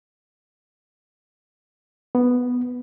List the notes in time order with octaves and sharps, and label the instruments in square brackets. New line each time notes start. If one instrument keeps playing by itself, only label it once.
[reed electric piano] B3